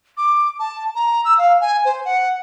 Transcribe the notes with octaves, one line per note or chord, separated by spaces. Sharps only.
D6
A5
A#5
E6
F5
G#5
C5
F#5